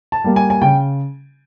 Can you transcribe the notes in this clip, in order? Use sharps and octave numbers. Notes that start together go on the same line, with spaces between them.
A5
G3 A#3
G#5
G#5
C#3 G5